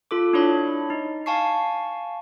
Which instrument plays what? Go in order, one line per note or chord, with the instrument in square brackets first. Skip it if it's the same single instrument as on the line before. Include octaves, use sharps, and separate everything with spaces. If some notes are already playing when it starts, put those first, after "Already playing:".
[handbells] F4 A4 D6
D4 E4 C#5 B5
D#4
F5 G#5 A5 C#6 C7